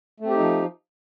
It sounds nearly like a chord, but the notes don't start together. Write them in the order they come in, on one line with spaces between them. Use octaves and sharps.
A3 C4 G4 D#4 F3